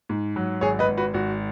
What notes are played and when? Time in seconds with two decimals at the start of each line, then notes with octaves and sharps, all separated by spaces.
0.09 G#2
0.36 F#3
0.61 G#1 G#4 C#5
0.79 B4 D#5
0.88 G#1
0.97 F#4 B4
1.14 G#1 F#4